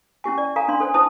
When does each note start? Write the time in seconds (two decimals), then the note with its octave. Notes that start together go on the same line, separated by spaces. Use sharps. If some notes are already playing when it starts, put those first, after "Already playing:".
0.24 C#4 E4 G4 G#5
0.38 D5
0.56 A4 F5 G#5 A#5
0.68 C#4 D4 C6
0.80 A4 C5 G#5
0.94 E4 C5 A5 D#6